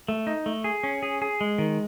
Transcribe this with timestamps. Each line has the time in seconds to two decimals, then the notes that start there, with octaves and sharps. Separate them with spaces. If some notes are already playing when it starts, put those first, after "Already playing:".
0.08 A3
0.27 D#4
0.46 A3
0.64 G#4
0.84 C#4
1.03 G#4
1.22 G#4
1.41 G#3
1.58 D#3